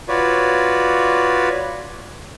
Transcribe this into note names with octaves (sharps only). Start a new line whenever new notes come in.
F4 F#4 B4 C#5 D5